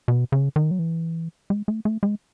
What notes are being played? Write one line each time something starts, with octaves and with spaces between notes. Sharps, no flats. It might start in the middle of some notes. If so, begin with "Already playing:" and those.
B2
C#3
D#3
F#3
E3
G#3
A3
A3
G#3